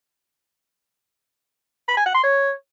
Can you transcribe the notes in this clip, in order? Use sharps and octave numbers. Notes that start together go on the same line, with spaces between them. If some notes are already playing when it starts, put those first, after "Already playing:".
B5
G#5
F#5
C6
C#5